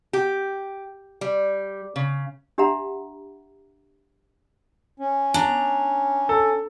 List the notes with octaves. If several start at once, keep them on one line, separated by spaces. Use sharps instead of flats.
G4
G3
C#3
D4 G4 E5 F#5 A#5 B5
C#4
D4 A#5
A4